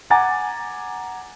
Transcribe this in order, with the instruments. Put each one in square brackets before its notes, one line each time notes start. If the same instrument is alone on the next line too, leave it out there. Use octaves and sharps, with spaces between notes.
[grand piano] F#5 G#5 A#5 D6 A6